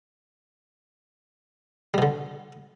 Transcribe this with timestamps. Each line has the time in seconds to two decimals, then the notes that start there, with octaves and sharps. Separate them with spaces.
1.94 G3
1.98 B2
2.02 D3